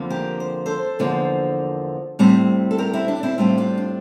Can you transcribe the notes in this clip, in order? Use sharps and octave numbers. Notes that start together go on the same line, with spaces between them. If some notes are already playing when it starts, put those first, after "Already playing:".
Already playing: F2 D3 F3 A#3
G4 A#4
C5
A4 C5
E2 D3 F3 A#3
A2 G3 C4
A4
G4 A#4
C4 E4
D4
C4 E4
A2 G3 C4 D4 F4
D4 F4
D4